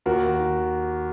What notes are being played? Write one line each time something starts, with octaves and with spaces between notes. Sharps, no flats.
D#2 F#4 A#4
D#3